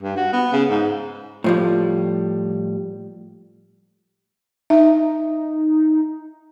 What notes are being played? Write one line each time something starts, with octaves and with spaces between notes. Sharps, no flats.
G2
F#4
B3
C#3
G#2
A2 F3 G3
D#4 E5